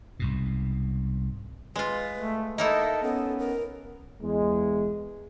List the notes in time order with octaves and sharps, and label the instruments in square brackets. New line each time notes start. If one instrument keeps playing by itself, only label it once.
[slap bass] C2 G#2 B2
[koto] G#3 F4 [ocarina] B4
[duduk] A3
[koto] A#3 D#4 E4 [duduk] A4 [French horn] D#5 [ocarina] E5
[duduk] B3 [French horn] C#4 [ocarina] A4
[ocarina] A#4
[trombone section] E2 G#3